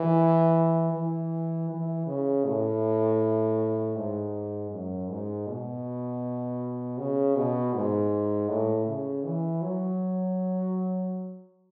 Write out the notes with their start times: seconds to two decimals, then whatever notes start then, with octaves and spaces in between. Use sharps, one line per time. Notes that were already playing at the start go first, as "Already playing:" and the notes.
Already playing: E3
0.94 E3
1.70 E3
2.07 C#3
2.45 A2
3.96 G#2
4.71 F#2
5.09 G#2
5.47 B2
6.98 C#3
7.36 B2
7.74 G#2
8.49 A2
8.87 C#3
9.25 E3
9.62 F#3